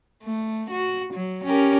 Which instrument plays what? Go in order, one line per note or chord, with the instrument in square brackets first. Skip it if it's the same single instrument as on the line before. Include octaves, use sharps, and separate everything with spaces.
[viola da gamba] A3
F#4
F#3
C#4 G4 A#4